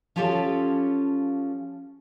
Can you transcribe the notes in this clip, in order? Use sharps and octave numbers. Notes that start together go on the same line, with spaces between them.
F3 C#4 F4 G4 A4 C#5